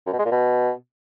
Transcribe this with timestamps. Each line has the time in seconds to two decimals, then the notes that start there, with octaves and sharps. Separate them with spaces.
0.06 F#2
0.13 B2
0.19 G#3
0.25 A#2
0.31 B2